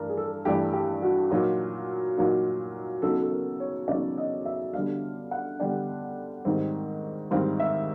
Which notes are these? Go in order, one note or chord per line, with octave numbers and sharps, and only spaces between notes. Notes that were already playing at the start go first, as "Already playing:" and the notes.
Already playing: G2 E3 A3 D4 A#4
G#4
A4
G2 E3 A3 D4 G4
G4
F#4
A#2 F#3 A#3 D#4 F4
A#2 F#3 A#3 D#4
C#3 F#3 B3 D#4 A4
A4
A#4
C#5
C#3 F#3 B3 D#4 D5
D#5
E5
D3 G3 B3 D4 F5
F#5
D3 G3 B3 D4 G5
G#2 D#3 G3 C4
G#2 D#3 G3 C4 F5
E5